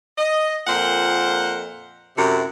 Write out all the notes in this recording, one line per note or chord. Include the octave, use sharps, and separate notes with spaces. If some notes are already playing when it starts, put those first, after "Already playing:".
D#5
F2 A#2 A#4 C5 F#5
F#2 A2 C3